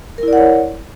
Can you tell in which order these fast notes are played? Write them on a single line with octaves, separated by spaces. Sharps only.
A#4 E4 D5 F#5 C#5